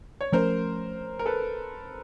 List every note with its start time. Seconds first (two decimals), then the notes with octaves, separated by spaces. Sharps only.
0.21 C#5
0.32 F3 A3 C#4 A#4 C5
1.19 A#4
1.26 A4 B4